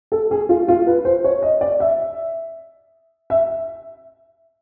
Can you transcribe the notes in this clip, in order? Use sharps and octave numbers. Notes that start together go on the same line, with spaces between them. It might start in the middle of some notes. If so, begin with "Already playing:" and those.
A4
G#4
F4
F4
B4
C5
C#5
D#5
D5
E5
E5